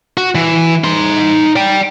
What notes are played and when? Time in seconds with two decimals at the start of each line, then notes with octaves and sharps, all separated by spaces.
0.17 F#4
0.35 E3
0.84 D#4 C6
1.56 D5 G5